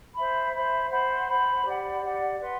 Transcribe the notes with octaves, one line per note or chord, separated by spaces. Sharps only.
C5 E5 B5
C5 E5 B5
C5 F#5 B5
C5 F#5 B5
G4 D5 F#5
G4 D5 F#5
B4 F#5 C6